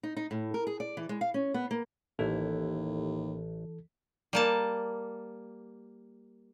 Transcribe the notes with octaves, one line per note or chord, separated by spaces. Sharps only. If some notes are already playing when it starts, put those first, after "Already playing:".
D#4
D#4
A2
A#4
G#4
D5
E3
G#3
F5
C#4
B3
A#3
A1 D#2 E3 E4 A4
G3 A#3 A5